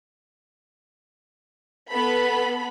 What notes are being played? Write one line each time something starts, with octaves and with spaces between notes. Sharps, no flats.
B3 A4 B5